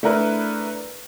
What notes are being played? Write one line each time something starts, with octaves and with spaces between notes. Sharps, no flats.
A3 D4 E4 A#4 B4